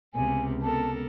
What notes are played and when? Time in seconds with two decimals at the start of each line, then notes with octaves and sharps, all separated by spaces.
0.14 C#2 C3 B3 G#5
0.63 B3 A4 A#4 A5